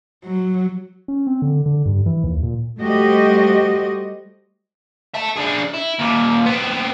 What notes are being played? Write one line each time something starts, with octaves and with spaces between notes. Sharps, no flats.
F#3
C#4
C4
D3
D3
G2
E3
D#2
A#2
G3 A3 F#4 G4 C5 D#5
E5 A5
D4 G#4
E4
D#2 A#2
B3 C4